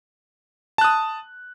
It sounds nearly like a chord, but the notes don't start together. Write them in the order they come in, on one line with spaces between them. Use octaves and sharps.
A5 F#6 D#6